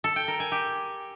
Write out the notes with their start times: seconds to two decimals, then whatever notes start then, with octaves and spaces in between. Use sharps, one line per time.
0.04 A4
0.16 G5
0.28 A#4
0.40 G#5
0.52 G4